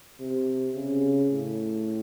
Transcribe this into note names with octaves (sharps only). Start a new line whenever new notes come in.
C3
C#3
A2